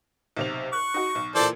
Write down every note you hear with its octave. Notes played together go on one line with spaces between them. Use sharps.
B1 C3 F7
C#6 F#6
D#4 F#4
B1
A#2 E3 A4 C5 D5